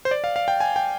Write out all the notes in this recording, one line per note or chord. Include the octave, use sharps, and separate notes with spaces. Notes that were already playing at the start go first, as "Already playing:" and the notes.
C5
D5
F5
F5
G5
G#5
G5